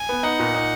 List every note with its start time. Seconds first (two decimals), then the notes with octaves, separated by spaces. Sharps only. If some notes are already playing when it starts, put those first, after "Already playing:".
Already playing: G#5
0.09 B3
0.23 D#4 F#5
0.39 A#2
0.55 D#4